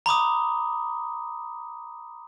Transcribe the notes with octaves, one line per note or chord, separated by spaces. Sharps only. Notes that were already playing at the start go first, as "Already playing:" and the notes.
A#5 B5 D6 D#6